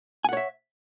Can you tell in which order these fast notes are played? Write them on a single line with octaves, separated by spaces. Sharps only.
G#5 F#5 C#5 E5